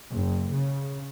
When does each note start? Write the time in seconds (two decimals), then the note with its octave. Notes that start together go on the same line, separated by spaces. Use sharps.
0.10 F#1
0.52 C#3